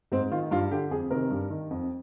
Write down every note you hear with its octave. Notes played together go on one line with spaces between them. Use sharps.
G#2 C4
D#3 F4
G2 F4
D3 G4
F2 G#4
C3 D#3 A#4
G2
D#3
F2